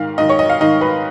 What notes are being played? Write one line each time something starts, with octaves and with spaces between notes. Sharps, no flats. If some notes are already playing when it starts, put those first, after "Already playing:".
Already playing: G#2 D#3 F5
G#2 D#3 D#5
C#5
D#5
F5
G#2 D#3 D#5
B4